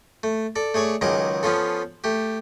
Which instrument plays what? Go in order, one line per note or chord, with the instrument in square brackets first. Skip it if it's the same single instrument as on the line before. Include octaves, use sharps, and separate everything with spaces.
[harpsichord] A3
A4 D5
A3 G#4 C#5 D5 C#6
C#2 D#3 F#3 G#4 D#5 D6
F3 B3 C#4 F4 A4
A3 G4